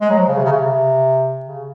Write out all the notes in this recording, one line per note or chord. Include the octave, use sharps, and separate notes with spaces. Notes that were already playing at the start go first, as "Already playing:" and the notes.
G#3
F#3
F3
C#3
C3
C#3
C3
C#3